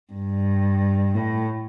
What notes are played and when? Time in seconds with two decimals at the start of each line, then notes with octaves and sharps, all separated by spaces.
0.13 G2
1.15 A2